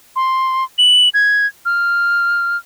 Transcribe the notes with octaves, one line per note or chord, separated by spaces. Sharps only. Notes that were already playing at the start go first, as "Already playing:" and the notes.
C6
F#7
G#6
F6